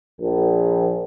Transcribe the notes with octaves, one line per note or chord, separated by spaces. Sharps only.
A#1